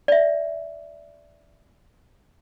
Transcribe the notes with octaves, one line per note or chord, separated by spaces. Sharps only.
D5 E5